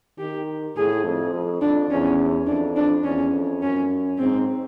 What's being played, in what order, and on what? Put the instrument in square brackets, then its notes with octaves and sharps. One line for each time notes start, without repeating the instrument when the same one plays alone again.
[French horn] D#3 [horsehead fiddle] G4
[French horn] A2 [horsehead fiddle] G#4
[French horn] F2
F2
[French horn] F2 [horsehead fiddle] D4
[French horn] E2 [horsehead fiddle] C#4
[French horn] F2 [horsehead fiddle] D4
[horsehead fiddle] D4
[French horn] E2 [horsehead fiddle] C#4
[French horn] F2
[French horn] F#2 [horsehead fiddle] C#4
[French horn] G#2 [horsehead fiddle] C4